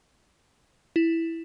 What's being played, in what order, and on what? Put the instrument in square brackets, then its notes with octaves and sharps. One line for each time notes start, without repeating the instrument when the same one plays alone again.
[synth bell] E4